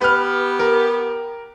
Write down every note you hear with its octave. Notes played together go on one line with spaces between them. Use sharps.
B3 G4 B4 F6
A#4